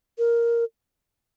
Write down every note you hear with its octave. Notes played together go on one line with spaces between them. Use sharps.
A#4